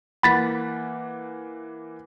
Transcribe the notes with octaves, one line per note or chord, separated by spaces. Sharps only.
E3 A#3 F#5 B5 A6 B6